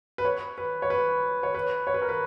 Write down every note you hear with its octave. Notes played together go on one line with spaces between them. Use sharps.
B4
C#5
B4
C#5
B4
C#5
B4
C#5
B4
A#4
B4